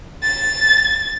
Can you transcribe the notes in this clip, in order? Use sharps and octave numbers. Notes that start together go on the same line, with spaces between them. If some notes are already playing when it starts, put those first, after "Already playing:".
A6